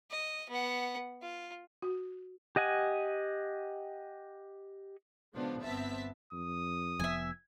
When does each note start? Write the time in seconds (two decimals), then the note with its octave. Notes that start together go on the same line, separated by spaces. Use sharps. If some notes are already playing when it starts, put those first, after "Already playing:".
0.11 D#5
0.49 B3 F#5
1.22 F4
1.82 F#4
2.56 G4 D#5 F#5 G#5
5.35 C#3 F3 G#3 B3 D4
5.63 G1 B3 C4 E5 A5 B6
6.33 F2 D#6
7.00 F1 F3 B3 E5 G#5